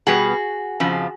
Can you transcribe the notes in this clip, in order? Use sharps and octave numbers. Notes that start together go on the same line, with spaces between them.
B2 G3 B3 F#4 G#4
F2 C#3 F3